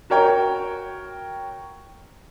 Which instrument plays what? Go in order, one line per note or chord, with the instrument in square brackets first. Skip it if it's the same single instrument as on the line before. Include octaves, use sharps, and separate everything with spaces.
[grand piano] F#4 A#4 C#5 G5